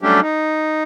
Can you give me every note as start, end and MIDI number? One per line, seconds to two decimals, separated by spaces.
0.02 0.20 54
0.02 0.20 55
0.02 0.20 57
0.02 0.20 61
0.02 0.20 62
0.02 0.20 67
0.21 0.83 63